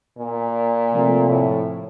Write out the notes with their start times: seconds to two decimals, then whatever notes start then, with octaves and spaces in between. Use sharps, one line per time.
0.18 A#2
0.92 C3 F3 A3
1.29 A2